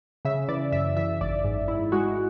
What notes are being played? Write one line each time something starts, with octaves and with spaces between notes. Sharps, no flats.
C#3 E5
E3 D5
F#2 E5
E3 E5
G#1 D5
G#2
G#2 E4
G#3 F#4